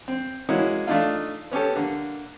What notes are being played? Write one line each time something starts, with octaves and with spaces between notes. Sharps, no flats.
C4
G#3 A#3 C#4 E4 F#4
A3 D4 D#4 F4
B3 C#4 G4 A4
D3 A#3